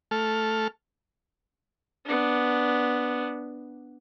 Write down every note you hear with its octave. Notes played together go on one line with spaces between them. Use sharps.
A3 A4 F6
B3 D4